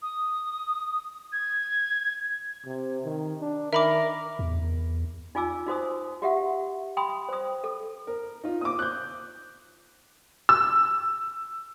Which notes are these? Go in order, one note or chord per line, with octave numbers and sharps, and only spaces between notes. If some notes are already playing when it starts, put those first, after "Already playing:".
D#6
G#6
C3
D#3
D4
D#3 A#4 E5 B5 D6
E2
D#4 F4 G#5 D6 E6
D#4 F#4 C5 D#6
F#4 G4 E5 F#5
G5 B5 C6 D#6
C5 D#6
A4
A#4
D#4 F4
D6 D#6
F#6 G6
E6